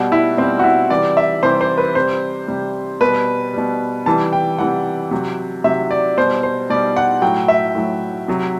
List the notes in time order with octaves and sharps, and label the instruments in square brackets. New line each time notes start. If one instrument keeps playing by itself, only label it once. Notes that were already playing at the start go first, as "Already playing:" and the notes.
Already playing: [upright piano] B2 G3 F#4
E4
B2 G3 C4
F#4
E4
C3 E3 G3 D5
E5
C3 E3 G3 C5
C5
B4
C3 G3 C5
C3 G3
B2 G3 B4
B2 G3
C3 E3 G3 A5
G5
C3 E3 G3 F#5
C3 F#3
C3 F#3 E5
D5
B2 G3 C5
C5
B2 G3 D5
F#5
A2 F#3 G5
E5
A2 F#3
C3 F#3